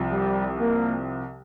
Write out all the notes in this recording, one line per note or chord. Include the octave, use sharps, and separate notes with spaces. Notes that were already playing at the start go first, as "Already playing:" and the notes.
Already playing: C2 C3 F3
G3
A#3